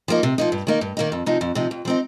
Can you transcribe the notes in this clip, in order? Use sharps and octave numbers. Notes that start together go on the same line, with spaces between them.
F3 A#3 D#4
C3
F3 A#3 D#4
G2
D#3 A#3 D#4
G2
D#3 A#3 D#4
F2
C3 F3 D#4
F2
C3 F3 D#4
F2
F3 C4 D#4